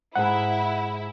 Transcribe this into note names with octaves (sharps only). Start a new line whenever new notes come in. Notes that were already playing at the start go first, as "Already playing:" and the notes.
G#2 E4 G#4 F#5